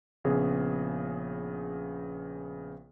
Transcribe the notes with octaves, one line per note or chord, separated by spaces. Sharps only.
A#1 C#3 B3 G#4